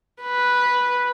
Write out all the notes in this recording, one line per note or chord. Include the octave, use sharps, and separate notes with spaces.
B4